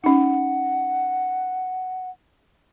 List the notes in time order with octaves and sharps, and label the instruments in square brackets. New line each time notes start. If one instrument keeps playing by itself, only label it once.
[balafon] C#4 D#4 [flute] F#5